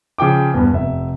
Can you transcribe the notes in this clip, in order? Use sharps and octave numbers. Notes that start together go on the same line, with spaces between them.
C#3 F3 G5 D6
E2 G2 B3
F1 E5